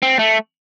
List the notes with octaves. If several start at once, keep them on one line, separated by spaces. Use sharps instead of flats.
C4
A3